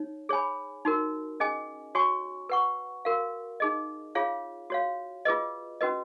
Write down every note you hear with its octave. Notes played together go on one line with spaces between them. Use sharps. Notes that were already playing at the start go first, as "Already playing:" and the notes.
Already playing: D#4 C#5
G#4 C#5 G#5 B5
D#4 F#4 A#4
C#4 G#4 D#5 G#5
F#4 C#5 G#5 C#6
B4 F#5 C#6
F#4 A#4 F5
D#4 G#4 D#5
F4 G#4 C#5 F5
F#4 C#5 F5
F4 G#4 B4 D#5
C#4 F#4 B4 D#5